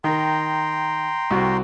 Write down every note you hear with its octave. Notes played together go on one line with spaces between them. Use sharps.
D#3 G5 A#5 C6
C2 F#4